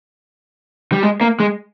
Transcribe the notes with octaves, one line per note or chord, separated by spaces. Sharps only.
G3
G#3
A#3
G#3